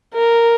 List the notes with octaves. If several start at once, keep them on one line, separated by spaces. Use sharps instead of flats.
A#4